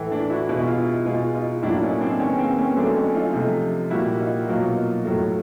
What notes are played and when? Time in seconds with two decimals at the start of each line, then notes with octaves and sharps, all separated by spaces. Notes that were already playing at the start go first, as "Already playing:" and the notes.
Already playing: A2 E3 A3
0.11 D4 E4
0.29 E4 F#4
0.49 B2 G#3 F4
0.58 E4
0.67 D#4 F4
1.06 B2 G#3 D#4 F4
1.35 D#4 F4
1.63 A2 F#3 A#3 D4 E4
1.82 C#4 D#4
2.01 C4 D4
2.19 D#3 G#3 B3 C#4
2.38 A#3 C4
2.58 B3 C#4
2.77 D3 F#3 A3 C4 D4
2.96 C#4 D#4
3.14 D#4 F4
3.34 C3 F3 A3
3.90 A#2 G3 A#3 E4 F#4
4.19 D#4 F4
4.48 B2 F#3 A#3 D#4 F4
5.05 A2 F#3 A3